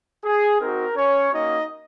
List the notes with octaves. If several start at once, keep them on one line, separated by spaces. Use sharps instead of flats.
G#4
C4 D#4 F#4 A#4
C#4 C#5
A#3 C#4 D#4 F#4 D#5